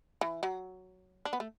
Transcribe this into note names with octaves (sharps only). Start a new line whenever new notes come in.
E3
F#3
D4
B3
A3